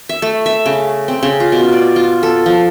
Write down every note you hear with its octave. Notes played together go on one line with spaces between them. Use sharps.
E5
A3
E5
C#3
C4
C#3
F4
B2
D5
F4
A4
F3